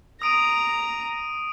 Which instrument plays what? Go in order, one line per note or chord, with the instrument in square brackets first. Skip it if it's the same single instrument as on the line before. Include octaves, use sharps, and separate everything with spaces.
[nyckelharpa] A#5 [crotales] D#6 D7 D#7